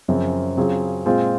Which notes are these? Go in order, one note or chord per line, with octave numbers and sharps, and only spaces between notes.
F#2 C#3 F3 C4
C#3 F#3 C4 F4 G#4
A#2 G#3 C4 F4